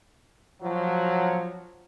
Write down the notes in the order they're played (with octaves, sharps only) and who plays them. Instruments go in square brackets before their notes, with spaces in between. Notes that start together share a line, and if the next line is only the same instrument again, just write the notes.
[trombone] F3 [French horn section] F#3